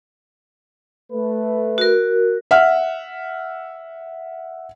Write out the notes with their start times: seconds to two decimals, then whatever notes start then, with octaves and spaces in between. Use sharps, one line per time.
1.11 A3 B4
1.78 F#4 A#4
2.51 E5 F#5 F6